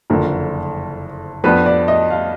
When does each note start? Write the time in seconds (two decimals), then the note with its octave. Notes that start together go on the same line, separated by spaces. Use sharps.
0.10 F#1 F2 D3 F3 A#4
1.44 F2 F3 B3 D4 B4
1.66 D5
1.88 D#5
2.10 F5